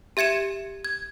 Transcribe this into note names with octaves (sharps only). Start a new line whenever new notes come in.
G4 E5 G#6 C#7 E7
G#6